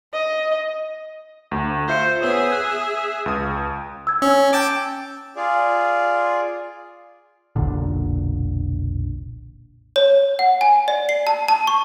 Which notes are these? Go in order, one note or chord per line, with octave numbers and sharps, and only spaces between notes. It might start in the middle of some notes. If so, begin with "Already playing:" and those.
D#5
D2
F4 C5 E5 C#7
B3 G#4 C#5 E5
F#6
C#2 D#6
E6 G#6
C#4 E6
G5 A5 D6
F4 G#4 D5
F1 B1 A#2 D3
C#5
F#5
G#5
D5
C7
A5
A5
C#6